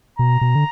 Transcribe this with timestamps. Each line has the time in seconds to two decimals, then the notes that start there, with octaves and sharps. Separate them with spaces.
0.19 B2 A#5
0.41 B2
0.55 D3